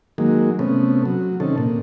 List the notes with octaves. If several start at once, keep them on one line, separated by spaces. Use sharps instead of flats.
D#3 F#3 G#3 A#3
C3 A3 B3 C#4
F#3
C3 D#3 C#4 A4
A#2